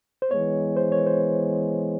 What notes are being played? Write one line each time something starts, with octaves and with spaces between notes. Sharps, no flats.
C5
E3 G#3 B3 C#5
C5
C#5
C5